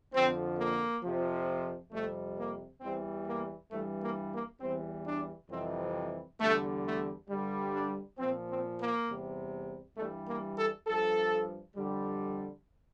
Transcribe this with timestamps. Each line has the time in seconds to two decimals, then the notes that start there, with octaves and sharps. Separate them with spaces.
0.14 F2 D3 F3 C4
0.58 A#3
1.03 F2 C3 F3
1.92 F2 C3 G3 A3
2.38 A#3
2.81 E2 E3 G3 C4
3.26 A#3
3.71 G2 E3 G3 A3
4.01 A#3
4.31 A#3
4.60 E2 E3 G3 C4
5.06 D4
5.50 F2 C3 E3 G3 C4
6.40 E2 D3 G3 A3
6.85 A3
7.29 G2 D3 G3
7.74 D4
8.18 A#2 F3 C4
8.49 C4
8.78 A#3
9.08 E2 C3 G3
9.97 G2 E3 G3 A3
10.28 A#3
10.57 A4
10.87 G2 F3 A4
11.76 F2 D3 G3